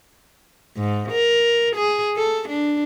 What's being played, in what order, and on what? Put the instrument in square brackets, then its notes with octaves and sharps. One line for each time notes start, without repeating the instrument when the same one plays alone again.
[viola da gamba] G#2
A#4
G#4
A4
D4